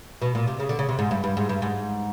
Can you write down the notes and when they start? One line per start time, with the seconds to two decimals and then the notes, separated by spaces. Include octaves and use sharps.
0.22 B2
0.35 A#2
0.48 C3
0.60 C#3
0.69 D3
0.79 C#3
0.89 C3
0.99 G#2
1.11 G2
1.24 G2
1.37 G#2
1.49 G2
1.62 G#2